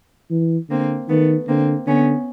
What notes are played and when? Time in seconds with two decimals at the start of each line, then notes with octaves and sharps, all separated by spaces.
0.30 E3
0.69 D3 A#3 C4
1.09 D#3 A3 B3
1.48 D3 A#3 C4
1.86 D3 B3 C#4